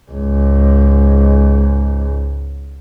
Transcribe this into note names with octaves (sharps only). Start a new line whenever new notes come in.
C#2 G#2